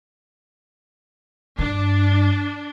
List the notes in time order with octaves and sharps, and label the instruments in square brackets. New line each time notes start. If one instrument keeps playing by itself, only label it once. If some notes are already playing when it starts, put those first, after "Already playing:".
[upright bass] G2 [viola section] D4